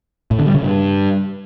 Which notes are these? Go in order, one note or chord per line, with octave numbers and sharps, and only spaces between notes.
A2
D3
G3
C#3
G2